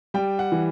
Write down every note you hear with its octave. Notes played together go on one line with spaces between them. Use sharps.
G3 G5
F#5
E3